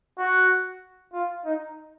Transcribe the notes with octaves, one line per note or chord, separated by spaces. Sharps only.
F#4
F4
D#4